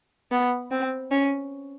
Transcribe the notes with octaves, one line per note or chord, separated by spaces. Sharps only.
B3
C4
C#4